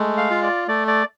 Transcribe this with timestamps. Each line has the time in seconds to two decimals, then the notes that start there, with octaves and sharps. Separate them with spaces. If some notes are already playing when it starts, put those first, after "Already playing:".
Already playing: G#3 A3
0.17 F5
0.30 F4
0.43 D5
0.68 A3 D5
0.88 D5